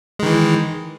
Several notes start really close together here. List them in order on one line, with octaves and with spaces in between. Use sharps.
G#3 D#3 E3